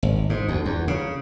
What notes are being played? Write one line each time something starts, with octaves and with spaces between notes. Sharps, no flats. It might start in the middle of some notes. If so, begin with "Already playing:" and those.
G#1
G#2
D2
E2
C#3